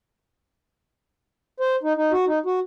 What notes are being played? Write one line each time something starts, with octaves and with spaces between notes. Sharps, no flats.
C5
D#4
D#4
F#4
D#4
F#4